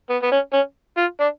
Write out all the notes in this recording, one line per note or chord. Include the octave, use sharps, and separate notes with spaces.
B3
B3
C#4
C#4
F4
D4